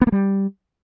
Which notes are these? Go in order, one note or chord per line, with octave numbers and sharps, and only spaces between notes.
B3
A#3
G3